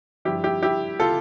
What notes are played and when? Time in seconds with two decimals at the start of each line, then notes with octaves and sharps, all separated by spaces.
0.25 G2 F3 E4 G4
0.44 E4 G4
0.62 E4 G4
1.00 F4 A4